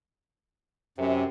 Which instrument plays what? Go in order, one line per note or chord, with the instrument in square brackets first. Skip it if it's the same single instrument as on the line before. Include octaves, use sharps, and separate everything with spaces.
[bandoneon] F#2 [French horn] C3